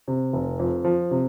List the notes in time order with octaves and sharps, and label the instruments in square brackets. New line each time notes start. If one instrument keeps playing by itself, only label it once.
[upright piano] C3
F1
F2
F3
C3